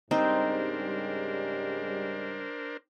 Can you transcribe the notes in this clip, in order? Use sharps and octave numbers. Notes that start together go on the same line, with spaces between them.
G#2 C#3 G3 C4 D4 D#4 A#4 C5